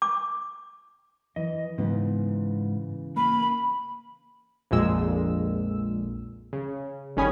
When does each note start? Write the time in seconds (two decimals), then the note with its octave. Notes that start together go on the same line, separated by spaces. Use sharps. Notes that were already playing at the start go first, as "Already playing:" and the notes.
0.02 D6
1.36 E3 D#5
1.78 G#2 C#3 E3 B3
3.17 A#3 B5
4.71 A#1 F2 A#2 G#3 E6
6.53 C#3
7.17 G1 D#3 C#4 G#5 B5 D#6